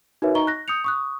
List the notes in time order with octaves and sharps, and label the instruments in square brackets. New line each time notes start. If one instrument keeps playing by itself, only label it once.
[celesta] D#4 F#4 A#4 B4 C#5 E5
D#4 D#5 A#5 C#6 G7
F#6 A#6
D#6 G6 C#7 F7
C#6 D#6 F#6